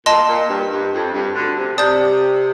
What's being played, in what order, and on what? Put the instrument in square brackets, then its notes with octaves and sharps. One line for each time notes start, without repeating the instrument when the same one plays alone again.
[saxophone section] A#2 [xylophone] D#5 A5 C6
[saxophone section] A#2
G2
G2
F2
G2
D2 D3
C3
[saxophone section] C3 [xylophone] D5 A5 D#6 G6